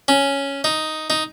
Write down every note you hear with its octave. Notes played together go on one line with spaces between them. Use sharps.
C#4
D#4
D#4